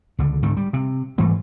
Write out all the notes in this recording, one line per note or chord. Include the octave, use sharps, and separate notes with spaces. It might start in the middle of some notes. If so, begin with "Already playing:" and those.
C#2 D3
G#2 D3 D#3
G3
C3
G#2 E3 G3 A3